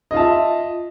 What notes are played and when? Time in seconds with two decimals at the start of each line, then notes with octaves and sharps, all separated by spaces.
0.11 D#5
0.14 F4
0.17 A5
0.20 E5